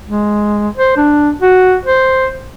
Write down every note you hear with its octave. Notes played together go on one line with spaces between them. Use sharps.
G#3
C5
D4
F#4
C5